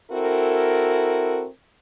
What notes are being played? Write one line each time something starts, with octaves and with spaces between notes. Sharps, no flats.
C4 E4 F#4 A4 A#4